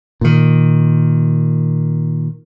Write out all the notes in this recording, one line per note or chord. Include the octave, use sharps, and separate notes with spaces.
A#2 D#3